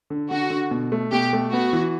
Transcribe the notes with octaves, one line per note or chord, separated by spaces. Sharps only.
D3
D3 F#4
D3
B2
A3
B2 G4
A3
B3 F#4
E3